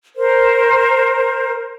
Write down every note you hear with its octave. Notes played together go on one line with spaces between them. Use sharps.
A#4 C5